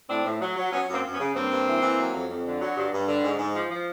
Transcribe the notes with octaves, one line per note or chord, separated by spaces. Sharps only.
A2 C4 D4
A2
F#3
F#3
F#3 B3 C#4
F#2 A#3 C4
F#2
B3 C#4
C#3
G2 A#3 C4
G2
E3
E3
F#3
F2
F2
D3
F#3
G2
G2
D3
G#2
G#2
F3
F3